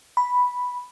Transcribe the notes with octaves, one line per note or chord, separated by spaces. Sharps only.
B5